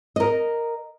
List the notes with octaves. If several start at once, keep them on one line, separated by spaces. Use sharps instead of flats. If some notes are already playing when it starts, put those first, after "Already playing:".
A#4 D#5